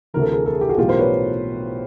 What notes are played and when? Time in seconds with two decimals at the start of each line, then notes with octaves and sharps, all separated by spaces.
0.14 D2 C3 E3 A#4
0.22 A4
0.32 G#4 A#4
0.46 A4
0.53 G#4
0.61 G4
0.69 F#4 G#4
0.77 B1 A2 E3 F4 G4
0.88 A#4 C5
0.99 B4 C#5